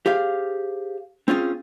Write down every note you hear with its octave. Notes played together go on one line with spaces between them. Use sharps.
G4 G#4 C5 F5
C4 C#4 F4 G#4